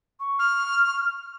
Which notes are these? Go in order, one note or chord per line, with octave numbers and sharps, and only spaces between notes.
C#6
F6